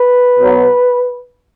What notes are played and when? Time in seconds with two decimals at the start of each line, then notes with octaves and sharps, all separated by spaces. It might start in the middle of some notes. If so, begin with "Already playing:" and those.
Already playing: B4
0.38 B2 F#3 B3